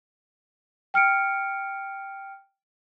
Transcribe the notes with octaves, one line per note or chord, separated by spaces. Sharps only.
G5 F6 C#7 D7